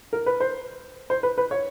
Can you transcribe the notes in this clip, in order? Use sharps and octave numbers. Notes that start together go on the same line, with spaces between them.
A#4
B4
C5
C5
B4
B4
C#5